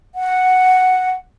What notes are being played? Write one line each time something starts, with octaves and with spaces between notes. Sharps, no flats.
F#5